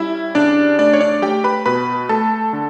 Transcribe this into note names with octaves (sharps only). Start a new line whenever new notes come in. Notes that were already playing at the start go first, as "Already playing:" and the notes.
Already playing: G3 C#4 E4 E5
C#3 D4 D5
A3 D4 D5
C#5
D4 D5
A3 G4 G5
B4 B5
B2 B4 B5
A3 A4 A5
D3